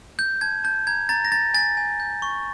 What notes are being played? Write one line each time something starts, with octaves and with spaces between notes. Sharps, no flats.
G6
A5 G#6
A5 G6
A#5 G#6
A#5 A6
A#6
A#5 A6
G#5 A6
G#5
G6
C#6